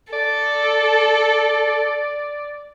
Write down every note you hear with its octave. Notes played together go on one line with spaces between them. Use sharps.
A4 D5